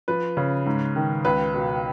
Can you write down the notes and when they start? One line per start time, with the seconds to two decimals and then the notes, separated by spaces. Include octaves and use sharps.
0.08 F3 B4
0.37 C#3
0.66 G#2
0.96 D#3
1.25 C#2 B4
1.54 B2